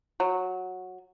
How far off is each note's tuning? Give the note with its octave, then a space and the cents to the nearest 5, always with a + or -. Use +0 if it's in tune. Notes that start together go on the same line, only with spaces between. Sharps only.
F#3 -10